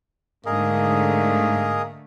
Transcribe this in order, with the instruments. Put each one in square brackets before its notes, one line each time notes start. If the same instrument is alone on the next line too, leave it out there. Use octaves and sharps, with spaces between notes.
[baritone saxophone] G#2 [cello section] D3 A3 [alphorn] A#3 [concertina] G#4 A#4 D#5